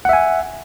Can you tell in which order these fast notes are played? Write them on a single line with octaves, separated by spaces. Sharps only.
F#5 E5 G#5